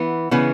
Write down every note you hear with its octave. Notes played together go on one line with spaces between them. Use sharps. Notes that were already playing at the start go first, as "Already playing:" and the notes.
Already playing: E3 B3
C#3 E3 B3